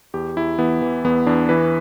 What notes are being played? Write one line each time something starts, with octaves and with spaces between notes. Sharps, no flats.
E2 G4
E2 E4
E3 B3
E3
E2 B3
E2 D4
E3 B4